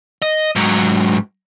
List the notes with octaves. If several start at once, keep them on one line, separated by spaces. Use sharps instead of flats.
D#5
G#2 F#3